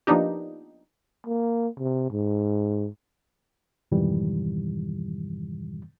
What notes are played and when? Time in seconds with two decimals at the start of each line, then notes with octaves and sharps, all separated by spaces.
0.07 F3 A#3 B3 D4 D#4 G4
1.27 A#3
1.79 C3
2.11 G#2
3.92 F2 G#2 B2 D#3 E3 G3